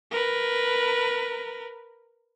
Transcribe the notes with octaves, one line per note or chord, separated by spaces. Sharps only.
A#4 B4